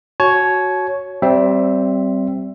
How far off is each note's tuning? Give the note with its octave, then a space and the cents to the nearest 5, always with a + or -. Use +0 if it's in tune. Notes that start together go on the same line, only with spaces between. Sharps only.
F#4 +0 C#5 +0 A5 -40
G3 -20 C4 +0 E5 +10